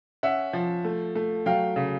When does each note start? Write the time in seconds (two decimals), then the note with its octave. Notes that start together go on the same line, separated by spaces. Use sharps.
0.23 C#4 E5 F#5
0.53 F3
0.85 A3
1.15 A3
1.46 F#3 F5 G5
1.76 C#3